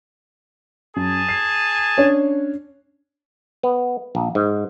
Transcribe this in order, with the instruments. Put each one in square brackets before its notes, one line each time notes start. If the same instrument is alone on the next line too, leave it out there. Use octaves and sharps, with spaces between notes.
[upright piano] F#2 [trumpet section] G#4 G#5 A5
[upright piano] C7
C#4 D4 C#5
[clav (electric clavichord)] B3
A#1
G#2